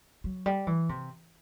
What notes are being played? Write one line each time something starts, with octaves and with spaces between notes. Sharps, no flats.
F#3
G3
E3
C3